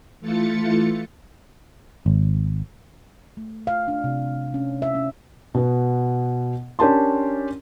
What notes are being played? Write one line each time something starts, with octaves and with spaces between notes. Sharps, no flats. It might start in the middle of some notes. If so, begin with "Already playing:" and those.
E3 A3 F4 A6 C#7
G#1
A3
F5
D4
C3
C#4
E5
C#4
B2 B3
C#4 D4 G4 A#4 A5 C6